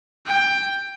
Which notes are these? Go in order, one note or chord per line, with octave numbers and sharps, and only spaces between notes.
G5